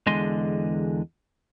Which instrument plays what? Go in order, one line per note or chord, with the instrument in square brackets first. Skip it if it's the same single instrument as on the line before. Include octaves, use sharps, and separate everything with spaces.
[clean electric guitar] E2 D3 G#3 D#5 C6